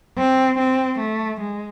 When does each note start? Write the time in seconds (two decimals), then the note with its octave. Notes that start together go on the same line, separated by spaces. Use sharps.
0.18 C4
0.58 C4
0.99 A3
1.41 G#3